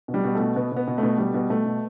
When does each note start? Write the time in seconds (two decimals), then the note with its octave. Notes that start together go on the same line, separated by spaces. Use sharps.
0.08 B2
0.14 G3
0.24 B2
0.35 B2 A3
0.56 B2 B3
0.72 B2 B3
0.87 B2
0.98 A3
1.03 B2
1.18 B2 G3
1.34 B2
1.50 B2 A3
1.66 B2